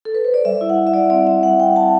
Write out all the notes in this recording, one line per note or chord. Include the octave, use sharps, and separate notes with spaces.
A4
B4
C5
D5
G3 E5
E4
F#5
G3
E5
G3 D5
C4 D5
G3 E5
G3 F#5
C4 G5
G3 A5